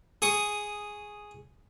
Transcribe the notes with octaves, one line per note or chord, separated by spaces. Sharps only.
G#4 C#6 D#6